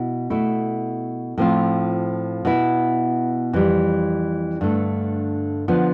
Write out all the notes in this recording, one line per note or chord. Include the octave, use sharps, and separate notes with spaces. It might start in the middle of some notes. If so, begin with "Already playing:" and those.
Already playing: B2 E4
B2 A3 E4
A2 F3 C4 F4
B2 B3 E4
F2 E3 G3
G2 D3 A3
D3 F3 B3